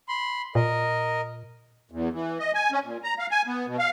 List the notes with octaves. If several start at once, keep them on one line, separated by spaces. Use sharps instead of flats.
B5 C6
A#2 A#4 D#5
E2
E3
D#5
G#5
C#4
A#2
A#5
F5
G#5
B3
B2
F5